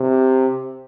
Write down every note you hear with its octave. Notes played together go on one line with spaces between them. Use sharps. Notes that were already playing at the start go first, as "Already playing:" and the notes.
Already playing: C3